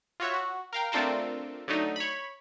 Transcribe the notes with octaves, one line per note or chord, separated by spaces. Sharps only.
F4 F#4 C#5 E5
F#4
A#4 F5 G5
A3 C4 D4 F4 A4 A#4
D3 F#3 A3 D#4
C#5 B5